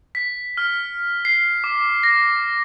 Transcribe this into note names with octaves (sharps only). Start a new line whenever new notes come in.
B6
F6
C7
D6
A#6